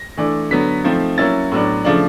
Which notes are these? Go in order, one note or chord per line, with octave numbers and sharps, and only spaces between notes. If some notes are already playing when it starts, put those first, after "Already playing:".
Already playing: A#6
E3 A3 D4
D3 F#3 B3 B6
F3 A3 C4 D#4
F#3 A#3 C#4 E4 A6
A2 F#3 B3 D4
C#3 F3 A3 D4